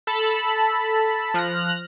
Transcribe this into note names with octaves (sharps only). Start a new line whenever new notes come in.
A4 A5 B5
F3 F6 F#6 A#6